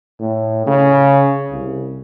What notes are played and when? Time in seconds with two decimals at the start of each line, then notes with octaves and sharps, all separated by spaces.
0.19 A2
0.67 C#3
1.51 C2